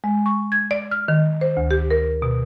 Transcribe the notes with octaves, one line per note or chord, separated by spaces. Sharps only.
G#3
C#6
G#6
D5
F6
D#3
C5
D2
G4
A#4
B2